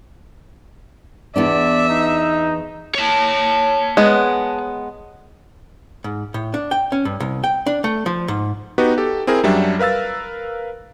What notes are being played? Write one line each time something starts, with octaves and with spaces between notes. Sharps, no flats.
E2 B3 D4 D5 E5
D#4
C#5 A5
G#3 B3
G#2
A2
D4
G5
C#4
G2
C2
G5
D4
A3
F3
G#2
B3 D#4 F#4 G4 B4
G4 A4
C4 E4 G#4 A#4
F#2 F#3 G3 D4 E5
A#4 B4 F5 E6 A6